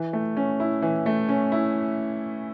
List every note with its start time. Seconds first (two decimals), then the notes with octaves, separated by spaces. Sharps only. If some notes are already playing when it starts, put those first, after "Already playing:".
Already playing: E3
0.13 A3
0.37 C#4
0.60 E4
0.82 E3
1.06 A3
1.29 C#4
1.52 E4